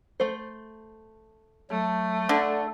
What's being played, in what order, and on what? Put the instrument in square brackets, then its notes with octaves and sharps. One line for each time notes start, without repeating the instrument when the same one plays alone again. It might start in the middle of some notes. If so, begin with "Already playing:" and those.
[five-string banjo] A3 C5
[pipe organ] F#3 [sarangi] A3
[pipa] D3 [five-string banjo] D4 [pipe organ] A4